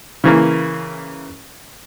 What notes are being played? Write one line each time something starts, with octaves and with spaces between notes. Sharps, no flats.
C#3 E3 A#3